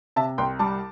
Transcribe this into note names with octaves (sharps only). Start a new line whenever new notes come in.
C3 E5 A5
C2 G5 C6
G3 A5 D6